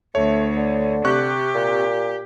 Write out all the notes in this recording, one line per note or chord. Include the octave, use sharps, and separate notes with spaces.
D2 A3 C#5
D3
C3 G4 C#6 F#6
A#2